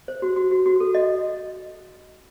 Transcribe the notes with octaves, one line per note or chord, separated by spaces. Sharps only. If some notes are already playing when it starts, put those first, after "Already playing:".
C5
F#4
F#4
F#4
F#4
A4
D#5